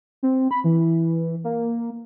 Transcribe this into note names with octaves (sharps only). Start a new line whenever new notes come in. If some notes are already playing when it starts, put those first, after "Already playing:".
C4
B5
E3
A#3